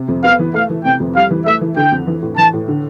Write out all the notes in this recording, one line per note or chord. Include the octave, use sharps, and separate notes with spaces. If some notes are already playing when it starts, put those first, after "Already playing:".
Already playing: C3
F2
B3 F5
E3
A3 F5
E3
C3 G5
F2
G3 F5
E3
A3 E5
E3
D3 G5
F2
E3
A2
E3 A5
A2
D3